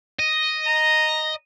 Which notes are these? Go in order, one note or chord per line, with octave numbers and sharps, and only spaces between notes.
D#5
A#5